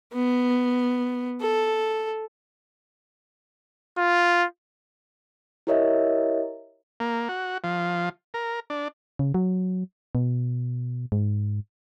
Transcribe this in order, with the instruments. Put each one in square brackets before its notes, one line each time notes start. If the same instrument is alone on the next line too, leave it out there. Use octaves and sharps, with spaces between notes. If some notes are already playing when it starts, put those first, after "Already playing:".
[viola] B3
A4
[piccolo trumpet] F4
[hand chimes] E4 G4 A#4 C#5 D#5 E5
[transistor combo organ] A#3
F#4
F3
A#4
D4
[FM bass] C#3
F#3
B2
G#2